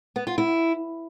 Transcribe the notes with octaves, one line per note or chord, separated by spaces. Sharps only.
B3
F4
E4